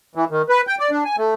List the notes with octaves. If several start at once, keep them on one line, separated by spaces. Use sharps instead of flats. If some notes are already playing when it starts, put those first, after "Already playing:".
E3
D#3
B4
G5
D5
D4
G#5
A3